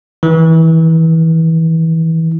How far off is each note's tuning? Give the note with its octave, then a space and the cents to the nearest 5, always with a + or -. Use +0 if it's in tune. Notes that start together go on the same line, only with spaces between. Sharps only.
E3 -25